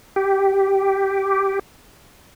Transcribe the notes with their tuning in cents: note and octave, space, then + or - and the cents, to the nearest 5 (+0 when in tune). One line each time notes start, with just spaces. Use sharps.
G4 -5